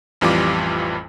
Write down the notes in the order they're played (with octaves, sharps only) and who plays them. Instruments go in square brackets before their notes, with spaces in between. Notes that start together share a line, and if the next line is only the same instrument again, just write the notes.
[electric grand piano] A1 F2 E3 G3 F4 D6